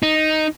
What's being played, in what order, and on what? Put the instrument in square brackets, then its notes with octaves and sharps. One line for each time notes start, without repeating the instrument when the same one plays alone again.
[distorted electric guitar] D#4